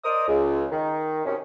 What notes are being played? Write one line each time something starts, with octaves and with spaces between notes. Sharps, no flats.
A#4 C5 D5 D#5 D#6
C#2
D#3
F#2 C3 D#3 C#4